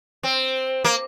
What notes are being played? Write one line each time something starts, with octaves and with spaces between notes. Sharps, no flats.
C4
A#3